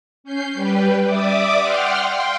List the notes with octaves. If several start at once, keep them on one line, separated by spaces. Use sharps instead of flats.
C#4 G6 C7
G3 G4 B4
D5 E5 D6 D#6
F#5 G5 C6 F6
F5 G5 C6